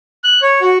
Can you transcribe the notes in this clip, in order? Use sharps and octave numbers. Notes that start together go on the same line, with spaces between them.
F#6
C#5
F#4